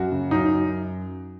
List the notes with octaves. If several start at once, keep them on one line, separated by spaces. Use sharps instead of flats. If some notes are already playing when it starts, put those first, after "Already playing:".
Already playing: F#2 F#4
C#3
F#2 D#4
F#2